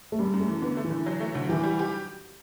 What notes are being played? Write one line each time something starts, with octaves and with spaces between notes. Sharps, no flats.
A3
F#2 G3
F#2
A3
E3
D3 B3
A3
E3
D3
F#3
A3
D2
E3 G4
G3
G4